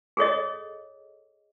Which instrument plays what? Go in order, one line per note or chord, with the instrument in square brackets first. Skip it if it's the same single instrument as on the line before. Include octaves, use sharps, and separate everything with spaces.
[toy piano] G#4 A4 C#5 D#5